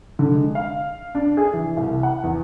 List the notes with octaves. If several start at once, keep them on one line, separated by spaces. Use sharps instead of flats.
D3
G#3
F5
D4
G#4
E3
C2
F#5
E2